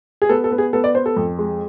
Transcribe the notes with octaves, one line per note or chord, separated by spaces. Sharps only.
G#4
B3 A4
A4
B3
G#4
B3 A4
D5
B3 C5
A4
F2
G#3